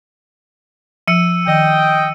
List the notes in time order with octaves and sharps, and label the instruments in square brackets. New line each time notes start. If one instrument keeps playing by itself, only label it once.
[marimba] F3 [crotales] E6 C#7 D#7
[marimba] D#3 [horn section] D#5 G5